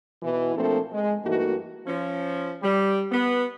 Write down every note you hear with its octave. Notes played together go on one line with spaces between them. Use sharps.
B2 E3
F3 A3 A#3 C4 D4 A4
G#3
G2 E3 A3 A#3 D#4 F#4
F3 C#4
G3
B3